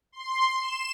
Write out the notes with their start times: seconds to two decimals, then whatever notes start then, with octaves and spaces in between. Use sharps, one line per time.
0.12 C6
0.61 E7